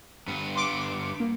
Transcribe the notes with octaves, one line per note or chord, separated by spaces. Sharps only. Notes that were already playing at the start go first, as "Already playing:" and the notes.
G2 B3
C6 D6 D7
A#3